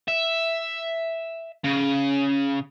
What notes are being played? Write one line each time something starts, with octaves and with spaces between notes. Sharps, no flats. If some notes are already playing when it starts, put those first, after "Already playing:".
E5
C#3